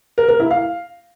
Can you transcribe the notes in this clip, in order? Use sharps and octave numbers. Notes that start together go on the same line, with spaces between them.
A#4
A#4
E4
F5